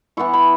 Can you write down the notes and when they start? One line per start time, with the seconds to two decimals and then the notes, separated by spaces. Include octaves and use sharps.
0.17 E3 B3 E4 C#6
0.34 B5